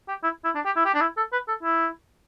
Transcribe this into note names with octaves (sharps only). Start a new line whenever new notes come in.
G4
E4
E4
D4
G4
E4
G4
D4
E4
A4
B4
A4
E4